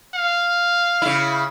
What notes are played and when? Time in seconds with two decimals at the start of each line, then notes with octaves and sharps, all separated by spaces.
0.15 F5
1.02 C#3 E4